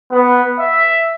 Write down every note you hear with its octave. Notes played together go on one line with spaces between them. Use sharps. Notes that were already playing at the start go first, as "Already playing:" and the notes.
B3
E5